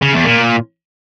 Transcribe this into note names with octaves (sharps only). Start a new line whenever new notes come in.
C#3
E2
A#2